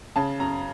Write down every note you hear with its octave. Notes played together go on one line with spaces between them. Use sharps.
C#3 A5
F#2 A#5